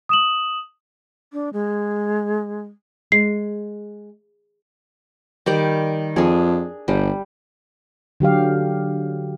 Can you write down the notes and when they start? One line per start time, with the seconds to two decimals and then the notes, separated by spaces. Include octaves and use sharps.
0.09 D#6 E7 F#7
1.33 D4
1.53 G#3
3.12 G#3 C7
5.46 D#3 G3 D5
6.16 F2 D4 G#4
6.88 G1 G3
8.20 D3 F#3 G4 F5